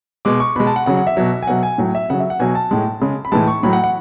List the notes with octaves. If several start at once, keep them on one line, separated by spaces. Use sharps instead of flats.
B2 G#3 D6
C#6
B2 G#3 B5
A5
F#5
C#3 F#3 F#5
F#5
E5
B2 F#3
G#5
B2 F#3 F#5
G#5
A2 F#3
E5
C#3 F#3 F#5
E5
F#5
B2 F#3 G#5
A5
A2 G#3
C#3 G#3
B5
A2 E3 G#3 A5
C#6
A2 F#3 B5
F#5
F#5